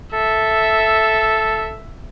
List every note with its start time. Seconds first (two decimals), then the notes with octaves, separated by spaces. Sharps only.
0.13 A4 E5